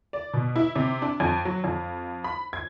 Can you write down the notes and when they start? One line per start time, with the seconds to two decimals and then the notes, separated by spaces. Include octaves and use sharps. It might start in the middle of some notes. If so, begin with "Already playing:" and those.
0.13 D5
0.33 B2
0.56 E4
0.76 C3
1.02 D4
1.20 F2
1.45 F#3
1.64 F2
2.24 B5
2.53 G#6